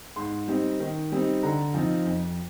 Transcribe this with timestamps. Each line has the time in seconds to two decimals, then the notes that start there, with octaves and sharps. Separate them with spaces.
0.16 G#2 C6
0.48 G3 C4 D#4
0.80 D#3
1.12 G3 C4 D#4
1.43 D3 A#5
1.74 F3 C4 D#4
2.06 F2